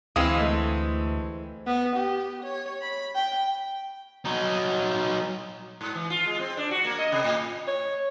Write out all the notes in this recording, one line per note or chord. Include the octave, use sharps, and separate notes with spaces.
D2 E3 G#3 C4 D#5 F5 D#6
A3
B3
G4
C#5
B5
G5
F#3 D#4
G#2
E3
F4
G#3
C4
D4
F#4
A#3
D#5
C3
A2
C#5